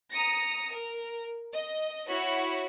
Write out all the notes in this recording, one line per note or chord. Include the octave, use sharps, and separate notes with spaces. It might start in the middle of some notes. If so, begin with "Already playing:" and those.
A#5 D#6 A#6 C#7
A#4
D#5
E4 F#4 C#5 B5